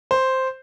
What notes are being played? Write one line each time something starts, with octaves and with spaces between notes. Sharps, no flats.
C5